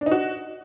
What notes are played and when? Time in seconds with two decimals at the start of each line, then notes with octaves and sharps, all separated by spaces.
0.01 D4
0.06 D#4
0.12 F#4